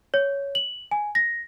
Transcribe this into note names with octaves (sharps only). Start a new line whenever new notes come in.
C#5
F#7
G#5
A#6